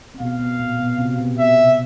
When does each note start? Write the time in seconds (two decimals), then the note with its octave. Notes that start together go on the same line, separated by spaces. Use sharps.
0.14 C4
0.20 B2 B3 F5
0.39 B2 B3
0.59 A#2 A#3
0.78 B2 B3
0.98 C3 C4
1.18 B2 B3
1.38 B2 B3 E5
1.58 C3 C4